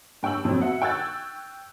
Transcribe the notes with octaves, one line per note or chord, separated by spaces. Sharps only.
G2 G5 C#6 E6 F#7
F2 F#3 C4
F#4 E5 F#5
G5 C#6 E6 F#6 G#6 A6